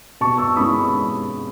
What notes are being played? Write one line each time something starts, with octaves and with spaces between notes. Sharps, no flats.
B2 A5 C#6
C#6 E6
G#3 C#4 E4 B5 D#6